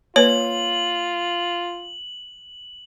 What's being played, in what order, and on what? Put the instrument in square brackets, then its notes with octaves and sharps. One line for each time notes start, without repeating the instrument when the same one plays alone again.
[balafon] A#3 B4 [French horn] F4 [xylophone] C#5 [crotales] F#7